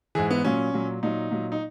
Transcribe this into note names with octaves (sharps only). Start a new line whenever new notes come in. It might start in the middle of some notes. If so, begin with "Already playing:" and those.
G#2 E3 G#4
B3
A#2 F#3 C#4
A#2 F#3
A#2 F#3 D#4
A#2 F#3
D#4